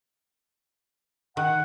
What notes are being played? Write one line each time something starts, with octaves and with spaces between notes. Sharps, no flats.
D#3 F#5